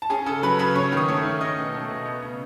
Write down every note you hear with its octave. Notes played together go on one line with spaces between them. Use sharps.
A5
C#4 G#4 G#5
C#3 A4 A5
F#3 B4 B5
C#3 B4 B5
C#4 C#5 C#6
D#3 D#6
A3 C#5 C#6
D#3
C#4 D#5 D#6
B2
A3
B2
B3
C#3